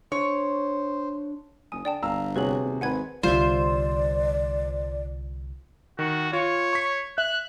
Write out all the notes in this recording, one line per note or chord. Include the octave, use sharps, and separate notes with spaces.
D4 C5 C#5
F#1 G#5 D#6
D3 D5 G5 A5
G1 F5 A#5 E6
C3 F#4 G#4 B4 C#5 F#7
D#1
G#1 C4 B4 F#5 G#5 G#6
C2 D3 G3 F4 C5 D5 E5
D#3 F#4
F4 C#5
C#6 B6
E5 F#6